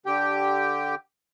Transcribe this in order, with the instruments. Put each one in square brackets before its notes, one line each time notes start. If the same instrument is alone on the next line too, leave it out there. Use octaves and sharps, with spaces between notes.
[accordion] D3 G4 G5